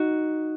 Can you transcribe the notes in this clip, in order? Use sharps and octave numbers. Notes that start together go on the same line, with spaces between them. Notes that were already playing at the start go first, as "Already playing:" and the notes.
Already playing: D#4 F#4